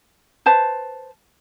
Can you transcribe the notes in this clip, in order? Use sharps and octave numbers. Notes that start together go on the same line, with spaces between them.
B4 C5 A5